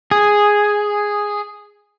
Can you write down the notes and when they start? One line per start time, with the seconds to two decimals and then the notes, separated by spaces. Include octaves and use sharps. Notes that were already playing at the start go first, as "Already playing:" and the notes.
0.11 G#4